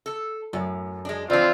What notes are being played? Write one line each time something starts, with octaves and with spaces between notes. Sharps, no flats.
A4
F#2 A2
G#3 D4
E3 C4 D4 F4 D5